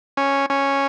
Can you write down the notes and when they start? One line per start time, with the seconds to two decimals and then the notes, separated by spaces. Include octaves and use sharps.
0.17 C#4
0.50 C#4